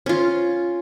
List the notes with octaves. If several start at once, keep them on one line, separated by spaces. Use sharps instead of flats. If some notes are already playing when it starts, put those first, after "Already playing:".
C#4 F4